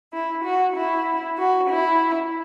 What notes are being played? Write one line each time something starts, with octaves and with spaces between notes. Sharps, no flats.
E4
F#4
E4
F#4
E4